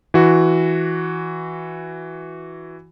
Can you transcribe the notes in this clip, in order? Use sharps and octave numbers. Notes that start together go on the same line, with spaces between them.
E3 F#4